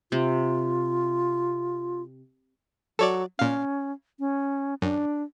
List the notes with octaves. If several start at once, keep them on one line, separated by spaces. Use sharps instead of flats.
C3 F4
F#3 A4 C#5 D5
A#2 C#4 F5
C#4
F#2 D4